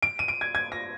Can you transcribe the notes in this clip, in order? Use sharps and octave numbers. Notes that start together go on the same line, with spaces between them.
D7
D#7
D7
G#6
G#6
A#6